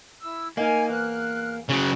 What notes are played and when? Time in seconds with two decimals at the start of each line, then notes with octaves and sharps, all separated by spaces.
0.21 E4 E6
0.57 A#3 D#4 A#4 D#5 G#5
0.89 E2 F6 F#6
1.70 D2 C#3 F#3